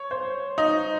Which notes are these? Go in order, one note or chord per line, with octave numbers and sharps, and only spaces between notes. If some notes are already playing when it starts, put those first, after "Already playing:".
Already playing: C#5
C5
D#4